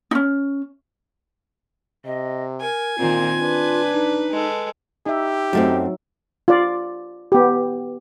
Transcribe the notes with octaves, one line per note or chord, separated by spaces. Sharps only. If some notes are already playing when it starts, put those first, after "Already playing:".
C#4 D#4
C3 D#5
A#4 G#5
A#2 D#3 C4 F4
D4 B4
D#4
G#3 A4
D#4 G4 E5
F#2 F#3 A3 C4 D#4
F4 D5
B3 G4